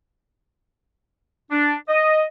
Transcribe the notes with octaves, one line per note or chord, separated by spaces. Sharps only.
D4
D#5